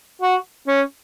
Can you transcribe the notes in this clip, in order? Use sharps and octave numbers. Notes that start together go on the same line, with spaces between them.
F#4
C#4